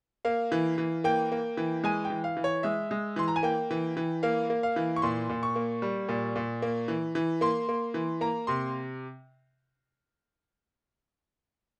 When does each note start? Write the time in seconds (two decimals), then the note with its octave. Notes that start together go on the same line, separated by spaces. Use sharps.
0.25 A#3 F5
0.52 E3
0.78 E3
1.04 A#3 G5
1.32 A#3
1.57 E3
1.84 G#3 G#5
2.05 G5
2.10 E3
2.24 F5
2.37 E3
2.44 C#5
2.63 G#3 E5
2.91 G#3
3.16 E3 C6
3.28 A#5
3.36 G#5
3.43 A#3 G5
3.71 E3
3.97 E3
4.23 A#3 F5
4.50 A#3
4.63 F5
4.76 E3
4.96 C#6
5.02 A#2 C6
5.29 A#2
5.43 C#6
5.56 A#3
5.82 G3
6.09 A#2
6.36 A#2
6.62 A#3
6.88 E3
7.15 E3
7.41 A#3 C6
7.69 A#3
7.94 E3
8.21 A#3 A#5
8.47 C3 C6